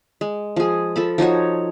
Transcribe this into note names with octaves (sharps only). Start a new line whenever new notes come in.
G#3
F3 G#4
F3 A4 B5
F3 D#4 F#4 C#5